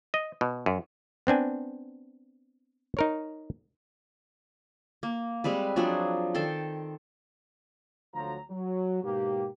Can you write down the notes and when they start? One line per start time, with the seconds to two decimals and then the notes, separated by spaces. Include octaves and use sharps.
0.14 D#5
0.41 B2
0.66 F#2
1.27 B3 C4 D4 G#5
2.97 D#4 A#4 C#5
5.03 A#3
5.44 G3 G#3 C4 B4
5.76 F3 F#3 D4 G#4
6.35 D#3 A4 G5 C6
8.14 D2 D3 F3 F#3 A#5
8.50 F#3
9.03 G#2 B2 A#3 G4